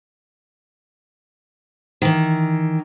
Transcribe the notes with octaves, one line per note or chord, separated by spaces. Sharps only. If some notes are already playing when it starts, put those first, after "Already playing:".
D#3 E3